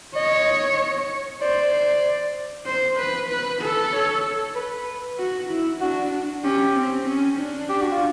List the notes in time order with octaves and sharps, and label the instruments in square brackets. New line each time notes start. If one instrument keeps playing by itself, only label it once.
[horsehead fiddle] C#5 [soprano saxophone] D#5
[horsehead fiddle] C5 [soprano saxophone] D5
[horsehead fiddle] C5
C5
B4
B4
A4
[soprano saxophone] C#5
B4
[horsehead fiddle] F#4
E4
[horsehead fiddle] D4 [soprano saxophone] F#4
[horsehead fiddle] C#4 [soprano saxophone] G4
[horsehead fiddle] C4
C#4
D4
[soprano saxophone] G4
F#4
F4